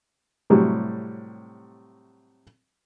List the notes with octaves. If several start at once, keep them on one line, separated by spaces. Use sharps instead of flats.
A2 C3 F#3 G3